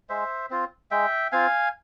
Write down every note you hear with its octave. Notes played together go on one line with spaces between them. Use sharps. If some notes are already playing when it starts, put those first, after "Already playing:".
G#3 C5 E5
C4 F4
G#3 E5 G5
C4 F4 F5 G#5